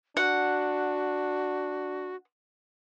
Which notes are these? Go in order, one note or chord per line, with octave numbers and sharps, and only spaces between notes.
D4 F#4 F#5